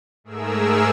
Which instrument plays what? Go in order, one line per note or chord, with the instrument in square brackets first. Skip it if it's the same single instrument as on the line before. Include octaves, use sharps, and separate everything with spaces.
[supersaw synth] G#2 A3 G#4 A#4 E6